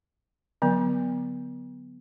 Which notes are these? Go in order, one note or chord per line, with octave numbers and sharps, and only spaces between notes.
D3 F#3 B3